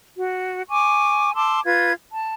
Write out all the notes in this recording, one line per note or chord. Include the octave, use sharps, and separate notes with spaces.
F#4
G#5 C#6 D6
A5 C6 D6 E6
F4 B4 G#6
A5